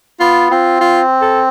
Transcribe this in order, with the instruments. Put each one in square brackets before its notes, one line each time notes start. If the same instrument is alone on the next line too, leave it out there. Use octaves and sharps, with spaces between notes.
[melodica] B3 [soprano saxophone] F4
[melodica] C4 [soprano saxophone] F4
[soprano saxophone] F4
A4